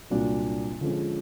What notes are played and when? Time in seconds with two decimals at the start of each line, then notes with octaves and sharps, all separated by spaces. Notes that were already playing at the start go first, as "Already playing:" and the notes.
0.10 C2 A#2 F#3 A#3 D4
0.81 D3 F3 G#3 C#4